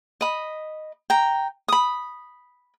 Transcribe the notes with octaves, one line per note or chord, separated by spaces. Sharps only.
D#5 B5
G5 A#5
B5 D#6